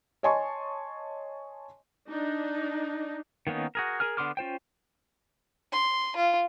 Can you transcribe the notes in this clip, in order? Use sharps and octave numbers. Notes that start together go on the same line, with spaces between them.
C#5 D#5 G#5 A5 C6 C#6
D4 D#4
D#3 A#3 B3 C#4 D#4
F#4 G#4 A#4
G#4 A#4 G#5 F6
D3 B3 C6 D6 F6
C#4 F4 C5 G5
C6
F4